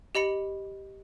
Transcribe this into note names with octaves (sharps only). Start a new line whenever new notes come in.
G4 D#5 B5 C#7